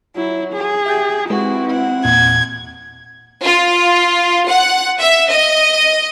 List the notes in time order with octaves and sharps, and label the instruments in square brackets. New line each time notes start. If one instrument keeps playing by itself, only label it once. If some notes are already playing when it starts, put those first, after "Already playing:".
[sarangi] F#3 [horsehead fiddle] E4
[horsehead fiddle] G#4
[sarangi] G4 [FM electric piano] E5 G6 A6
[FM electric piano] G#3 B4 [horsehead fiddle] C4 E4 [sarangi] F#4
[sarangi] F#5
[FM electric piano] E2 A#2 [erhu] G#6
[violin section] F4
F#5
E5
D#5